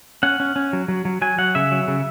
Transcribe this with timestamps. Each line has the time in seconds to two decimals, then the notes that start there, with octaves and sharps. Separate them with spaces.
0.23 C#4 F#5
0.40 C#4
0.56 C#4
0.73 F#3
0.88 F#3
1.05 F#3
1.22 F#3 G#5
1.38 F#3 F#5
1.55 C#3 E5
1.72 F#3
1.88 C#3